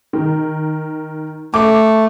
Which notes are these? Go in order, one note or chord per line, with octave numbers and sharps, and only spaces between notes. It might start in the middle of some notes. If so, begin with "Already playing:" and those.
D#3
A3 D6